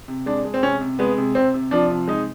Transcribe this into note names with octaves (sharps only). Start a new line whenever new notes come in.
C3
G#3 D4
G#3
C4
C3 C#4
C3
G#3 B3
C3
C3 C4
C3
F3 D4
C3
G#3 D#4